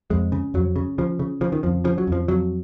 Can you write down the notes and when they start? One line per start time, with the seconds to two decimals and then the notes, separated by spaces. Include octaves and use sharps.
0.10 F2 G#3
0.32 C#3
0.54 F2 F#3
0.76 C#3
0.98 C#3 F3
1.19 C#3
1.41 C#3 F3
1.52 D#3
1.63 F2 F3
1.84 C#3 F3
1.98 F#3
2.07 F2 F3
2.28 F2 F#3